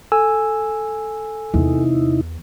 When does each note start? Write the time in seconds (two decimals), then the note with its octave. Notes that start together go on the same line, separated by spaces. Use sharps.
0.12 A4 G#5 E6
1.54 E2 C3 D#4 E4